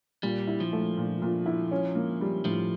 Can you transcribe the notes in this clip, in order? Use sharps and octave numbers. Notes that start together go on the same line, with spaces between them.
A#2 G3
E4
F3
A3
A#2
A#2
E4
C#4
A#3
G3
A2 F3